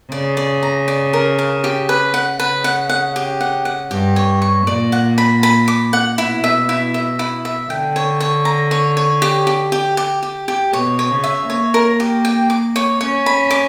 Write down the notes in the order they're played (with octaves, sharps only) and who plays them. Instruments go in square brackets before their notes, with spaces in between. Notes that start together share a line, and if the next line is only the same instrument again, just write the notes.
[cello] C#3 [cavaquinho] D5
[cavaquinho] D5
A#5
D5
A#4
A#4
G4
B4
F#5
[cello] C#3 [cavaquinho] B4
[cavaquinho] F#5
F#5
G4
F#5
F#5
[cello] G2 [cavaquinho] G4
[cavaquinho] C#5
C#6
[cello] A#2 [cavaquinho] D5
[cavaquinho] F#5
B5
B5
D6
F#5
[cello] B2 [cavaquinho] E4
[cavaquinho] E5
E4
E5
E4
E5
[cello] D3 [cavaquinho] G5
[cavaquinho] C#5
C#5
A#5
C#5
C#5
G4
G4
G4
G4
G4
G4
[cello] B2 [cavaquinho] C#5
[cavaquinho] C#5
[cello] C#3
[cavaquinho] E5
[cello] A#3 [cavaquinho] C#5
[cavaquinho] A#4
G4
G5
D6
C#5
[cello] C#4 [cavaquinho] C#5
[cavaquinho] B5
D6